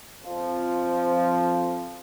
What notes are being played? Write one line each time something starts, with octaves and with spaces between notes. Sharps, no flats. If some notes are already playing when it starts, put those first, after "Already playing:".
F2 F3